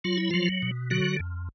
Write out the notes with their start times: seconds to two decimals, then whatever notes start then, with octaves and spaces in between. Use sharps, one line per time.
0.04 F#3 F4
0.17 E4
0.30 F3 F#3 F4
0.62 B2
0.90 D3 F#3 F#4
1.20 F2